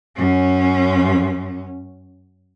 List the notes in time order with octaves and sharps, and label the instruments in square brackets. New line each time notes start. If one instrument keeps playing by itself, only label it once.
[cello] F#2 C#4